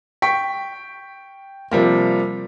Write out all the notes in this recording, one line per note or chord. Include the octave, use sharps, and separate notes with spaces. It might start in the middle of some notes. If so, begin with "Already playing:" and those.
G5 C#6 B6
C3 F3 G3 A#3